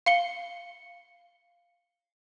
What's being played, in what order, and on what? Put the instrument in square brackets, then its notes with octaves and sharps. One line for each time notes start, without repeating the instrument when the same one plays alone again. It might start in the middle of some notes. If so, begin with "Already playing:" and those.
[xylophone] F5 C#7 G7